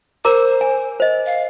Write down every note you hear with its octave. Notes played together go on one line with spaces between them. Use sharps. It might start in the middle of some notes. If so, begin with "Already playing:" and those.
A#4 C5 A#5 D6
G#5
C5 D#5
F5